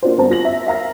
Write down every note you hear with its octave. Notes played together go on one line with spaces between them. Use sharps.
A#3 D4 F4 F#4 C5
G2 B3 C4 C5 A5 A#5
F4 A#6 F#7
E5
E5 F5 A#5 A#6